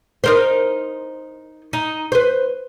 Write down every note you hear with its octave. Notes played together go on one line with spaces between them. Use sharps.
D#4 A#4 C5
D#4
B4 C5